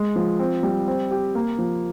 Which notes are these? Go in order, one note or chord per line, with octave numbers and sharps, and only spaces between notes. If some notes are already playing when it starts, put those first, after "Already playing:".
Already playing: G#3
F3
C4
G3
C4
G4
A#3
F3